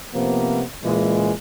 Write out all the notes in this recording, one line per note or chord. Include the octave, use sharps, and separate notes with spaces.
C3 F3 A#3 B3
A#2 C#3 E3 G#3